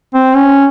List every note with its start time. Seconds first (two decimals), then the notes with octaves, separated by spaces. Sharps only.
0.14 C4
0.36 C#4